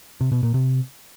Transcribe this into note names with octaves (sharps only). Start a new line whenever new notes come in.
C3
B2
A#2
C3